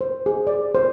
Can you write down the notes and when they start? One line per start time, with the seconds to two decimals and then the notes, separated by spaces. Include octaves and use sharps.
0.01 C5
0.26 G#4
0.47 D5
0.75 C5